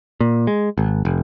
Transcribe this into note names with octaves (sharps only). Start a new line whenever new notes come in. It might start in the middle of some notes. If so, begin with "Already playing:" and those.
A#2
G#3
G#1
F1